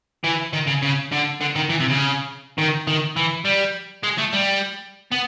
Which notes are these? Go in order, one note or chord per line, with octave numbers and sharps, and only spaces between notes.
E3
D#3
C#3
C#3
D3
D3
D#3
E3
C3
C#3
D#3
D#3
E3
G3
G#3
A3
G3
B3